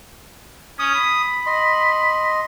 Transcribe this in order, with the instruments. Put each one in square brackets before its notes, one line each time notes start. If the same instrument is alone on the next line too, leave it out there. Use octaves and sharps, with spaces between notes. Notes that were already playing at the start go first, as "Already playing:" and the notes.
[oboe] C#4 [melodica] D#6
[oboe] B5
[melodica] D#5 C6